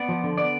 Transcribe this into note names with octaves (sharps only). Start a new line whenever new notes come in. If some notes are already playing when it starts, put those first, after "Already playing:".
Already playing: B3 D5
F3
D3
B3 D5